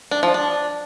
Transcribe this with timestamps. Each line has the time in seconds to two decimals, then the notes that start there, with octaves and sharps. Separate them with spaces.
0.11 D4
0.23 F3
0.34 D4